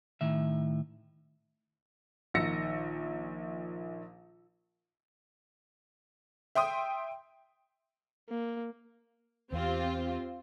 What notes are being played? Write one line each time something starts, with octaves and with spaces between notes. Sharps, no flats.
A2 D#3 E5
A#1 D#3 E6 A#6 C#7
E5 G5 C6 D#6
A#3
E2 C4 F4 G4